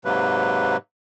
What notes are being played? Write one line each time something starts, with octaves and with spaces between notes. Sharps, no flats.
G#2 C3 F#3 A#3 B4